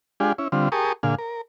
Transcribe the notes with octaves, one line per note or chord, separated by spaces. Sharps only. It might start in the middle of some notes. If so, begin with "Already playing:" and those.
G#3 D4 F4 G4 G#4
C#4 E4
D3 G3 C4 F4
G4 G#4 A#4 A5 C#6 D#6
A#2 D3 G#4 F5
A#4